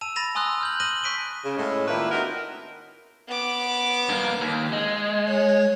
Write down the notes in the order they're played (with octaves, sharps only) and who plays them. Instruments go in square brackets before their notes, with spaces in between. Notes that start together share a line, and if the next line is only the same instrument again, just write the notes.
[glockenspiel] A5 E6 D#7 F7
B5 A6 A#6 D#7 F7
G#5 C6 D#6 E6 F#6
F6 G6 F#7
D#6 F#6 A#6 D#7 F#7 G7
C#6 F#6 B6 D7 D#7 G7
[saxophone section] C#3
A2 G#3 C#4
D#3 A#3 D4 E4 F4 B4
C4 D#4 F#4 A#4
[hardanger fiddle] B3 D6
[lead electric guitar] G2 A#3
D#2
G#3
[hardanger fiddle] C#5